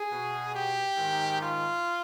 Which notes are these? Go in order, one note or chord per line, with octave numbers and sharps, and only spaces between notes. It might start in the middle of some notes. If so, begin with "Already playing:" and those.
Already playing: G#4
B2
G4
G#2 D#3
F4